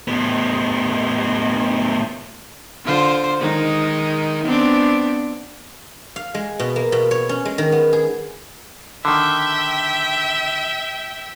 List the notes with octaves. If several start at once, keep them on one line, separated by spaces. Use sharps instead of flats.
A2 B3
D3 F4 C5
D#3 G#3 D#4
B3 C4 D4
F5
G#3
B2
A#3
B2
C#5
C#4
G#3
D#3
B3
G#4
D3 D#3 E5 G5